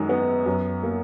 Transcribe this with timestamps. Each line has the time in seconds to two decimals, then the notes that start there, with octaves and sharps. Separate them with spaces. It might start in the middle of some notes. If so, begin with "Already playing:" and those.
Already playing: F#2 D#3 G#3
0.09 B3
0.46 F#2
0.83 A#3